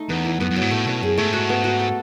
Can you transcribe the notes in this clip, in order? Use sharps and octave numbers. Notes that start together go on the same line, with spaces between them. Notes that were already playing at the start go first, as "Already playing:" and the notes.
Already playing: A3 D#4
E2 B3
E4
F#2 B3
F#2
F#3
G#2
A2 A3
B2 C#4
F#2 G#4
G#2 A3
F#4
B3
F#4
A4